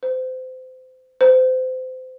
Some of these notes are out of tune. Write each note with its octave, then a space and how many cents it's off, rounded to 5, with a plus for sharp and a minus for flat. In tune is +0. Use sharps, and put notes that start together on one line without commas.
C5 -30
C5 -30